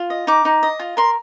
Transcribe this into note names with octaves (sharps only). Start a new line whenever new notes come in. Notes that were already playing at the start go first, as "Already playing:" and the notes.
Already playing: F4
D#5
D#4 D6
D#4
D#5
F4
A#4 C6